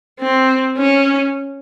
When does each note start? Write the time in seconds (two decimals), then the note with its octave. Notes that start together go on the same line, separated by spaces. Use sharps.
0.20 C4
0.77 C#4